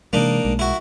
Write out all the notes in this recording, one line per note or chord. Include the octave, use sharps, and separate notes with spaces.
C3 E3 G#3 A#3 D4 D#4
B1 G#3
E4 F#4